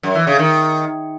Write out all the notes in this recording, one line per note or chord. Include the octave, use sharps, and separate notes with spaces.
F#2
E3
C#3
D#3